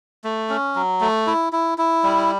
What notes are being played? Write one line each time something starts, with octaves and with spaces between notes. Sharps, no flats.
A3
C#4
F#3
A3
E4
E4
E4
G3